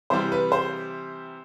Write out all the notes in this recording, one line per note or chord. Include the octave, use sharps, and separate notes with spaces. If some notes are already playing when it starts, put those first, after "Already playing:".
C3 E3 G3 C5
B4
C5